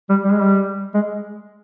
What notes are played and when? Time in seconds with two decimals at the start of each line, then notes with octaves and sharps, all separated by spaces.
0.10 G3
0.24 G3
0.32 G#3
0.41 G3
0.94 G#3